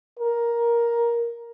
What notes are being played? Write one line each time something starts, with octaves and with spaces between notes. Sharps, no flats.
A#4